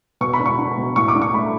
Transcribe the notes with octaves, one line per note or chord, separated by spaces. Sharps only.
B2 C#6
B5
D4
C#6
D4
B2
A2 C#6
D6
D4
C#6
A3 B5